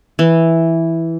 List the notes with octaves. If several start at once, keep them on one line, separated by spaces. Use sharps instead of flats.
E3